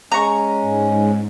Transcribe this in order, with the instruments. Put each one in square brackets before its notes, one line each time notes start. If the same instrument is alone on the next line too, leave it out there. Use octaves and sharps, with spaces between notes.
[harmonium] G#3 C#4 [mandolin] A#5 C#6
[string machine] G#2